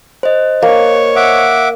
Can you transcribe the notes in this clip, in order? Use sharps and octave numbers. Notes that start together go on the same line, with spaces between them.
C5 D#5
A#3 C#5
E5 F#5 D6